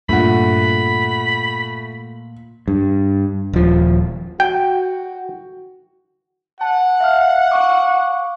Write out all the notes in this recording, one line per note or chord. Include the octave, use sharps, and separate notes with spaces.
G2 A#2 A3 F#5 B5
G2
D#1 F3
F#4 G5
F#5 A5
E5 F5 F6
F5 C#6 D6